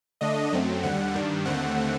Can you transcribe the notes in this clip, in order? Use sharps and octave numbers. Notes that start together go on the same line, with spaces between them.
D3 A3 D4 D#5
F#2 F#3 A3 C4
D#2 D3 G3 F#5
G2 D#3 G3 D4
D#2 D3 A3 C4 F#5